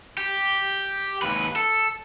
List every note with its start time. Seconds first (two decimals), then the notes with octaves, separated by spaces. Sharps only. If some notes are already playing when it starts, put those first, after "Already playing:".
0.18 G4
1.22 D#2 B4
1.56 A4